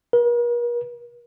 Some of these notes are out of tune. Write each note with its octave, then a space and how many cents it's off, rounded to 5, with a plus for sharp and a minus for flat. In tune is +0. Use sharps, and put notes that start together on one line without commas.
A#4 +45